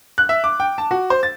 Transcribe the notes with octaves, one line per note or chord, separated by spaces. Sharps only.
F#6
E5
D6
G5
A5
F#4
C5
A6